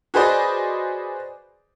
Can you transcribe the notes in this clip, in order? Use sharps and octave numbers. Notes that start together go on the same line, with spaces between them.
F#4 G#4 B4 C5 D5 D#5